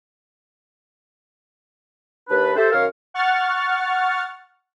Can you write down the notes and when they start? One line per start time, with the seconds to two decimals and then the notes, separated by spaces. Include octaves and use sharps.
2.29 D#2 D4 B4
2.56 G4 A4 C5 E5
2.72 F#2 D#3 A#4 C#5 F5
3.14 F#5 C#6 F6 A6